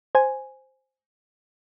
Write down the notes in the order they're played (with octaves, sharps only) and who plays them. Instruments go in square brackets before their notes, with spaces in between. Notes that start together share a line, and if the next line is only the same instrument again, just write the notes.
[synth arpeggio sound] C5 G#5